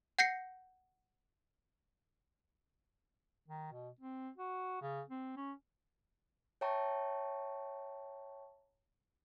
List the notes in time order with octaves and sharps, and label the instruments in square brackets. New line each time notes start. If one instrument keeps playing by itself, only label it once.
[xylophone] F#5 G6 A#6 C7 C#7
[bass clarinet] D#3
B2
C4
F#4
C#3
C4
C#4
[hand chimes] C#5 E5 G5 A5 A#5 C#6